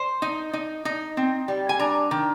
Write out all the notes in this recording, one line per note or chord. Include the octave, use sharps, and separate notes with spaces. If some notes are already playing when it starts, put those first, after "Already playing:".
Already playing: C5
D#4
D#4
D#4
C4
G3
G#5
D4 A#5
D#3